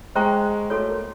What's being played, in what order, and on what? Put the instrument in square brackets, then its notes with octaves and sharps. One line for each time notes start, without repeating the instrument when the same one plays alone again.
[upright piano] G#3 [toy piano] C5 E5 G5 A#5 C#6
[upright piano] A3 [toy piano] F#4 A4 C#5
[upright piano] A#3